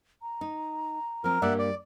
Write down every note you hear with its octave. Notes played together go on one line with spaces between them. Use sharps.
A#5
D#4
F3 C4 A#4
G2 G3 A#3 D5 E5 F#5
D5